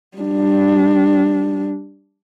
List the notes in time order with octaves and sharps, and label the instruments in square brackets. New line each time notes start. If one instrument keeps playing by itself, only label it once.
[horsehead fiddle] G3 D4